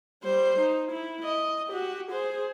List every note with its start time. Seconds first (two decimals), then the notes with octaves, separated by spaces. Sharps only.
0.23 G3 C5
0.59 D#4
0.91 E4
1.24 D#5
1.68 F#4 G4
2.11 G#4 C5